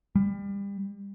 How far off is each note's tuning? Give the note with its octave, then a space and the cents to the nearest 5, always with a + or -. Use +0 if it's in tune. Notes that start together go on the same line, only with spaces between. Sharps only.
G3 +30